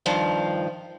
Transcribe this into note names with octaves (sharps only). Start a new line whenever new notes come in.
G2 D#3 F3